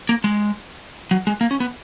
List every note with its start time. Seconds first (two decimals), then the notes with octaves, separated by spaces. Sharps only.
0.09 A#3
0.24 G#3
1.11 F#3
1.27 G#3
1.41 A#3
1.51 C#4
1.60 B3